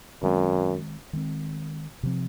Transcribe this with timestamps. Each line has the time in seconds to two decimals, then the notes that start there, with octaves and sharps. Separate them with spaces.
0.23 F#2 D#3 G#3 C4
1.13 D#3 G#3 C4
2.03 C3 F3 C4